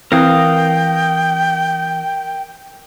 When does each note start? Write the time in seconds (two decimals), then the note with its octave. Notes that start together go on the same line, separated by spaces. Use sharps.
0.12 E3 C4 A#4 F5 G5 D#6